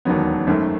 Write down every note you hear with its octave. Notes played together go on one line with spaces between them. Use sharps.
E1 D#2 D#3 F#3 B3
G#1 F#2 D#3 A3